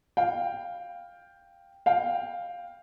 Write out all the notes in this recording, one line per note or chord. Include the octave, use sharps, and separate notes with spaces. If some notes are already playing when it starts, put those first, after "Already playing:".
F5 G5
F5 G5